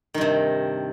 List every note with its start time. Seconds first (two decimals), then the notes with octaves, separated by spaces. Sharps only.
0.14 D#3
0.18 G2
0.21 C3